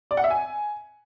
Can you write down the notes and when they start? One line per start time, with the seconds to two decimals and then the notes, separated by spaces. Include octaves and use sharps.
0.11 D5
0.17 F#5
0.24 E5
0.31 G#5